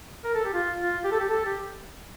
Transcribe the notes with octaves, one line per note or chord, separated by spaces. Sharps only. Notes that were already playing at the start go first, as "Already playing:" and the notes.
A#4
A4
G4
F4
F4
G4
A4
G4
A4
G4